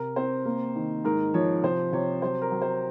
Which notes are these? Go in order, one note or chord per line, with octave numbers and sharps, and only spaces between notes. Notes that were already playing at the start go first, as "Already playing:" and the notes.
Already playing: C3 A#4
C4 C5
A#3
D#3
G#2 A#4
F3 C#5
C3 C5
C3 C#5
F#3 C5
A#4
F#3
C5